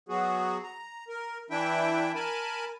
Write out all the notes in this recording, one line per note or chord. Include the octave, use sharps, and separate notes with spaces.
F#3 B3 F#4 G#4
A#5
A#4
E3 D4 E4 E5 G5
A#4 G#5 A5 B5